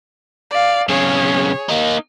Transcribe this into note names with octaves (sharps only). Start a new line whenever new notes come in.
D5 F5
B1 C#3 G#4 C#5
A#3 D#4